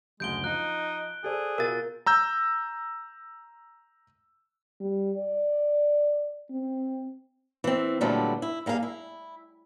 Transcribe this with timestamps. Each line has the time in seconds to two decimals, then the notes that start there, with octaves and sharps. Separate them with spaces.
0.20 F#1 D2 G#3 G6 D7 G7
0.44 F3 D#4 F#6
1.24 G#4 A4 C5 D5
1.58 B2 F4 A#4 A6
2.06 A#5 E6 G6
4.80 G3
5.18 D5
6.51 C4
7.64 E3 C4
8.01 A#2 D3 F#3 G3 A3 B3
8.42 E4
8.66 G3 A#3 G#4 A4 F5
8.83 E4